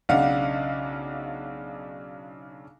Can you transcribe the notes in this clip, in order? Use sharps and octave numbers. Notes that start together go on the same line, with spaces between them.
B1 C#3 D4 F5 F#5